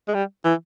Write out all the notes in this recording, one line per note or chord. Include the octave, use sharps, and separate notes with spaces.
G#3
G3
E3